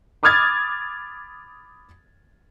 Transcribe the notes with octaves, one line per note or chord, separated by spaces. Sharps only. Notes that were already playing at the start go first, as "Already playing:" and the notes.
B5 D6 D#6 F6 G#6 A6